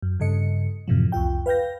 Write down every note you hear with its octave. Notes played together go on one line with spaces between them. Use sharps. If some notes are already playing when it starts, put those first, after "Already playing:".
F#2
G2 C#3 A4 D#5 C#7
F#2 A2 C3 E3 F3
C2 F2 F4 G5
B4 F5 G5 G6 A#6